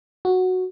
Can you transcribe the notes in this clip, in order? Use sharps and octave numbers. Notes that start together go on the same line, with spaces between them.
F#4